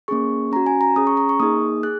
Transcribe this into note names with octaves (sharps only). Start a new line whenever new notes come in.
A#3 C#4 G#4 C#6
C#4 F#4 A#5
G#5
A#5
C#4 G#4 D#6
C#6
A#5
C#6
A#3 D#4 G#4 D#6
G#4 F#6